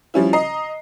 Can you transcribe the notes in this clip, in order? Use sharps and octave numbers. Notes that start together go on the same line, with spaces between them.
F3 G3 C#4 E4
D#5 A#5 C7